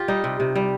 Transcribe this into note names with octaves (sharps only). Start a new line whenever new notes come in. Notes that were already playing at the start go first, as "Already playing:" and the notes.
Already playing: F4 G4
G3 D#4
C3
C3
G3